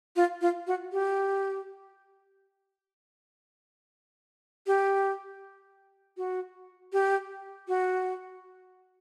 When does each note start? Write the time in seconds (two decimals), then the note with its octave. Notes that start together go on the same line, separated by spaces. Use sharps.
0.16 F4
0.41 F4
0.67 F#4
0.92 G4
4.67 G4
6.17 F#4
6.93 G4
7.68 F#4